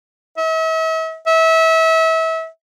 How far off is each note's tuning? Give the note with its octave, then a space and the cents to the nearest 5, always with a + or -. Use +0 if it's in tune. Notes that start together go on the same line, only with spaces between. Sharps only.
E5 -40
E5 -30